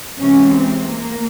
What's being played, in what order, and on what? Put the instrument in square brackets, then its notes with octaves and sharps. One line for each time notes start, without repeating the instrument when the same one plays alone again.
[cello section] C3 E3 G#3 C#4
C4
A#3